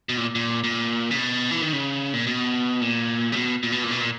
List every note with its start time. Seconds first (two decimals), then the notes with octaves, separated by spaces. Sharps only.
0.09 B2
0.17 A#2
0.35 A#2
0.64 A#2
1.11 C#3
1.18 B2
1.51 E3
1.63 D#3
1.73 C#3
2.13 A#2
2.27 B2
2.81 A#2
3.32 C#3
3.36 B2
3.63 A#2
3.72 B2
3.83 A#2
3.91 B2
4.01 A#2